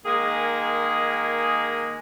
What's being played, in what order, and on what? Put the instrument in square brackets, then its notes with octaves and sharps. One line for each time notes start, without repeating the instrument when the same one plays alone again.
[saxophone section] D#3 G#3 A#3 G#4